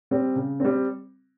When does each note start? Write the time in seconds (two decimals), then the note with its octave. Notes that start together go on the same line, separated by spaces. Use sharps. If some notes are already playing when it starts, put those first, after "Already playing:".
0.11 G3 C4
0.36 C#3
0.60 G3 C4